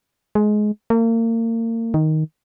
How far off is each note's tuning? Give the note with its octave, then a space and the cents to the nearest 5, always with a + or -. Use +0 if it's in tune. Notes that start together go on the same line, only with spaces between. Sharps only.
G#3 +20
A#3 -35
D#3 +5